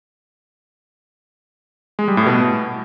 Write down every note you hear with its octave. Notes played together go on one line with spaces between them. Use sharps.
G#3
G3
A2
B2